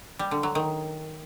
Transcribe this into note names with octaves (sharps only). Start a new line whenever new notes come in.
G3
D3
F#3
D#3